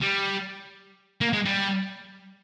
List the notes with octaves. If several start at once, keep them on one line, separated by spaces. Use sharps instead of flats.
G3
A#3
G#3
G3